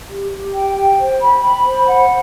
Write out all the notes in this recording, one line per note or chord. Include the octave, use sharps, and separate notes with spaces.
G4
G4
G5
G5
C5
B5
B5
C5
F#5